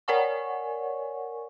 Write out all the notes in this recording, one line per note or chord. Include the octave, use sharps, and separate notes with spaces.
A#4 C#5 D5 F#5 G#5 C#6